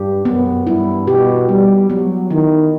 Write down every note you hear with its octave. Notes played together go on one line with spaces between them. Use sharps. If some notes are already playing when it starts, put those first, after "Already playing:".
Already playing: G2 G4
F#2 B3
G2 E4
B2 G4
G3 B3
F#3 B3
D#3 E4